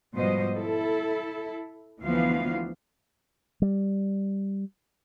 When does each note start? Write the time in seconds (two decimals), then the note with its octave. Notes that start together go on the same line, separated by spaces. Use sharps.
0.14 G#2 B2 F3 G3 C5 D#5
0.55 E4 A4
2.01 D2 E3 F3 B3 F5
3.62 G3